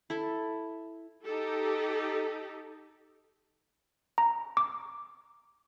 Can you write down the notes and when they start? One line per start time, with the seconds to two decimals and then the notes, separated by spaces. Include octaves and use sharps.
0.10 E4 A4
1.24 D#4 G4 A4
4.18 A#5
4.57 D6